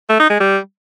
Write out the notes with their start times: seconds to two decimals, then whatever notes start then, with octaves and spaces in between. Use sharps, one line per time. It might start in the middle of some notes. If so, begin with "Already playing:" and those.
0.09 A3
0.20 D#4
0.30 G#3
0.40 G3